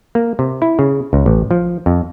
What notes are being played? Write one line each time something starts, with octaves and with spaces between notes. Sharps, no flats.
A#3
C3
E4
C#3
C#2
A1
F3
F2